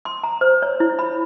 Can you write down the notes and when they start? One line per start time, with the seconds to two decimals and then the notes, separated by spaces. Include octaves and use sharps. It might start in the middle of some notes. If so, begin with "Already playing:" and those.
0.05 C6
0.24 A#5
0.41 C5
0.62 C#5
0.80 E4
0.99 B5